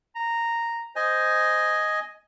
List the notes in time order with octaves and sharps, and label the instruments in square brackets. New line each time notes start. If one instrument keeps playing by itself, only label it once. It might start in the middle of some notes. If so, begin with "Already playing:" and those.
[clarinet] A#5
[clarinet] C5 [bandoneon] D#5 G#5